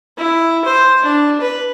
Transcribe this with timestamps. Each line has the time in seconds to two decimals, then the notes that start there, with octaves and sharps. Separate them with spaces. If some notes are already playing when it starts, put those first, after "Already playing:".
0.18 E4
0.65 C5
1.03 D4
1.41 B4